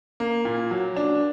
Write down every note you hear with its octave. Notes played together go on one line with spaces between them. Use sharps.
A#3
A#2
F#3
D4